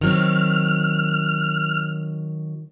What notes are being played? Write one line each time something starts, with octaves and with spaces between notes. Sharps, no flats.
D#3 F#3 C4 F6